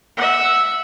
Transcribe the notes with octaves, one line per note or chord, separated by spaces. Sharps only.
E5 F#5